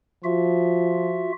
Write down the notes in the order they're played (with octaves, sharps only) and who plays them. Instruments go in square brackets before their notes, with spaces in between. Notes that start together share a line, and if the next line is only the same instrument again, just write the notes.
[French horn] F3 [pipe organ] F4 F#4 E5